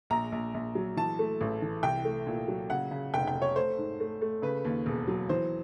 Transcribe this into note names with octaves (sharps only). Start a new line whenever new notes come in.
A#1 A#5
A#1
A#1
F#3
E3 A5
A3
A1
E3
C2 G5
A3
A#2
F#3
C#3 F#5
C#3
F1 G5
G5
F1
C#5
A3 C5
G#2
A3
A3
C#3 B4
D#2
E1
F#3
E3 C5